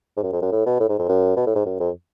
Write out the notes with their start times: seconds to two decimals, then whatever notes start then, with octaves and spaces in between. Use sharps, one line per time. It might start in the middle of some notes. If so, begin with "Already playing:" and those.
0.17 G#2
0.23 F#2
0.33 F2
0.42 F#2
0.52 A2
0.66 B2
0.80 A2
0.89 G#2
0.99 F2
1.09 F#2
1.36 B2
1.46 A2
1.55 G#2
1.66 F#2
1.80 F2